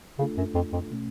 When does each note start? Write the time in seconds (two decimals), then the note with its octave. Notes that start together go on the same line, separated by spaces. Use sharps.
0.19 C#3 A3 D4 F4 A4
0.38 F#2
0.55 F2
0.73 F2
0.91 B2 A3 C#4